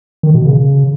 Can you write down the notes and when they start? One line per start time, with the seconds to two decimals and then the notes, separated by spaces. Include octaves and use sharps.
0.23 D#3
0.34 B2
0.45 C#3